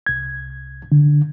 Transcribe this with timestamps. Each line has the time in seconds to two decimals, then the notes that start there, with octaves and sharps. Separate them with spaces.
0.06 C2 G#6
0.92 D3